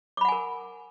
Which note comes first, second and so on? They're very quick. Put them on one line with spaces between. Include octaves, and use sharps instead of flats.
D6 B5 F#5 G#5 A#4